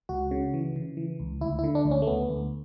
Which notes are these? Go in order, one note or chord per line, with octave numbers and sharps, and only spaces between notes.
C#2 F#4
C#3
E3
C#3
E3
C#2
D2 E4
E4
D3
D4
D2
C#4
A3
D2 B3
D2